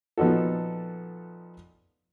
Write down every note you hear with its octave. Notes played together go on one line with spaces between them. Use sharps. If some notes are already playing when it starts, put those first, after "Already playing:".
A#2 F3 B3 D#4 F#4 A4